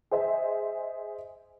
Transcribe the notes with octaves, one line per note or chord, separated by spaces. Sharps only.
G#4 C5 D#5 E5 G#5